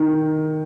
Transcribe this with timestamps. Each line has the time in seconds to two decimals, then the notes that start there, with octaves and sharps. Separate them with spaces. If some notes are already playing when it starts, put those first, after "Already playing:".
Already playing: D#3